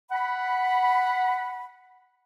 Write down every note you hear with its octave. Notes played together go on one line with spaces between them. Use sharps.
F#5 B5